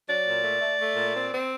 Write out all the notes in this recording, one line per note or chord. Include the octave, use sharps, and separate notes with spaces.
F#3 D5
A#2
A3
A3
A3
A#2
C4
C4